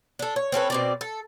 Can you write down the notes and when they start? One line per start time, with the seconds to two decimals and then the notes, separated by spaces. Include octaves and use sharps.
0.19 D4 A4
0.36 C#5
0.52 C4 C#4 A4 B4
0.70 B2 C4 D5
1.01 A4